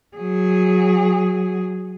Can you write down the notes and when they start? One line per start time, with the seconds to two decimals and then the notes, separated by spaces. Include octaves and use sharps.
0.17 F#3 G#4